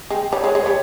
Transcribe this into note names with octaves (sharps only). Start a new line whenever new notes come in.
G#3 G5
G3 C#5
G#3
C#5
G#3
G3 C#5